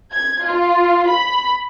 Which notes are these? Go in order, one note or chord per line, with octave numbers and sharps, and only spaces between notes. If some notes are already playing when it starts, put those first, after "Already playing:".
G#6
F4
B5